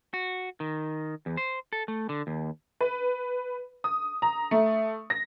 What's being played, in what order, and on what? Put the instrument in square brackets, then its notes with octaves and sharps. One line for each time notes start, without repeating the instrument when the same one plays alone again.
[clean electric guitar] F#4
D#3
E2
C5
A4
A3
D3
D#2
[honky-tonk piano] B4
D#6
A#5
A3
A#6